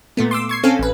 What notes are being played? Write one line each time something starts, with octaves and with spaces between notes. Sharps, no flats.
A#2 A3 B3
C6 D6 E6
C#6 G#6 C7
C4 C#4 A4 F5 G#5
A1 B4